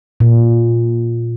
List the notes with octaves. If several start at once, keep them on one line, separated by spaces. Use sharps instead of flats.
A#2